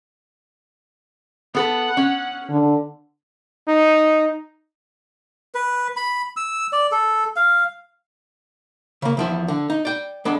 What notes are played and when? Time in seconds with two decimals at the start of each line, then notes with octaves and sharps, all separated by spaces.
1.55 B3 A4 B4 F#5
1.97 C#4
2.50 D3
3.68 D#4
5.55 B4
5.96 B5
6.36 E6
6.72 D5
6.91 A4
7.36 F5
9.02 C#3 A#3
9.17 E2 F3 E4
9.48 D3
9.70 D#4
9.85 D5 G5
10.25 G#3 B3 D4 A4